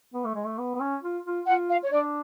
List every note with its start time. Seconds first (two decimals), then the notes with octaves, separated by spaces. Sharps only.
0.14 B3
0.25 A3
0.35 G#3
0.46 A3
0.58 B3
0.75 B3
0.80 C#4
1.03 F4
1.25 F4
1.47 F4 F#5
1.69 F5
1.83 C#5
1.91 D4 D5